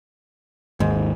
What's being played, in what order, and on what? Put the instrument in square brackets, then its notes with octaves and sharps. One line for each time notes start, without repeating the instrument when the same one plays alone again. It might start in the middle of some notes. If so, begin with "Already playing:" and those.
[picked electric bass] G#1 D#2 [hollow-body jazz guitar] G#2